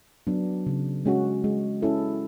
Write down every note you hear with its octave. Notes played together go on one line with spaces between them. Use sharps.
F#3 B3 D4
C#3
G#3 C#4 F#4
G#3
C#4 E4 A4